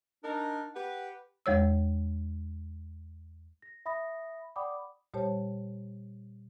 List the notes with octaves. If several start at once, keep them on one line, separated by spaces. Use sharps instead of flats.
D4 D#4 A#4
G4 B4 F#5
E2 G#3 C#5 E6
A#6
E5 B5 D#6 A#6
D5 F#5 G5 B5 D6 D#6
A#2 G3 G4 C5 C#5 A5